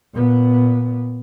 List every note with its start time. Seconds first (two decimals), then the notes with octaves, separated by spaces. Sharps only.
0.13 A#2 B3